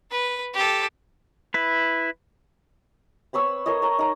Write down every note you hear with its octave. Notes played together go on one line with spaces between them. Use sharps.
B4
G4 A4
E4 B4
C4 B4 C#5 E6
A4 A#4 C#5 D#5
C#5 A#5
D#4 A#5